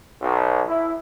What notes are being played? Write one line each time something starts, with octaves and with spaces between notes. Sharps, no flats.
B1
E4